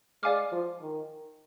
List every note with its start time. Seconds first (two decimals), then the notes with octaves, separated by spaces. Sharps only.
0.23 G#3 D5 F5 G#5 D6 F6
0.52 F3
0.81 D#3